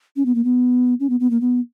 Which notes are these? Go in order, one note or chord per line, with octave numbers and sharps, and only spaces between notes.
C#4
B3
A#3
B3
C#4
B3
B3
A#3
B3